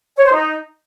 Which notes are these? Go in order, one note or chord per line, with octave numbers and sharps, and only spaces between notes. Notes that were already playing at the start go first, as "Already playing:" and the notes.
C#5
C5
D#4